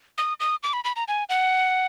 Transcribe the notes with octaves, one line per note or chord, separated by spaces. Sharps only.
D#6
D#6
D6
B5
B5
A#5
G#5
F#5